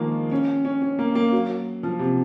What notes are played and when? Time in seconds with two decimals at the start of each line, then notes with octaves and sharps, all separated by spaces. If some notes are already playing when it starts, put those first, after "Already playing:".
Already playing: D#3 F3 G#3 A#3
0.31 C#4
0.65 C#4
0.82 C#4
0.99 A#3
1.15 A#3
1.32 F#3
1.83 F3
1.99 C3